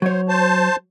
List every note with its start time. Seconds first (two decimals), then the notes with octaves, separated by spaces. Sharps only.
0.02 F#3 C5 C#5
0.29 C5 A5